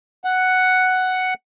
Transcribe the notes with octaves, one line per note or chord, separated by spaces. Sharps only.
F#5